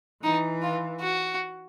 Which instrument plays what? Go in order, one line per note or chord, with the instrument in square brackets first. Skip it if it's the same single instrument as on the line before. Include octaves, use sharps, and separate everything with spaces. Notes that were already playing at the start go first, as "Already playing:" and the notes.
[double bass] E3 [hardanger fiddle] D#4
[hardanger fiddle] F4
F#4